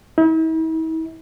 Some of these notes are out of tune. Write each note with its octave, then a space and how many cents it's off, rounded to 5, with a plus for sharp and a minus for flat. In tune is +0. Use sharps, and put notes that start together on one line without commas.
E4 -45